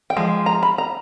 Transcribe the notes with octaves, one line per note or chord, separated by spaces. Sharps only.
G5
F3 G#3
A#5
B5
A#5